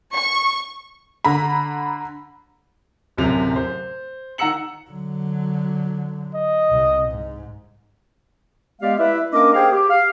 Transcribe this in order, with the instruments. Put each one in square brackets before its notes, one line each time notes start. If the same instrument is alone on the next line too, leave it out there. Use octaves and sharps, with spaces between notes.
[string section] C#6
[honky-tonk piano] D3 A#5 B5
[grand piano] D1 F#2 C3 F7
C5
D#3 F#5 A#5 E6 C#7 F#7
[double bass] D3 F#3
[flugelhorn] D#5
[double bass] C2 C3
G#2
[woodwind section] G#3 B3 G4 D5 F5
E4 B4 D5 E5
A#3 C#4 D4 A#4 D#5 D6
G4 G#4 A#4 C5 F5 G5
G4
F5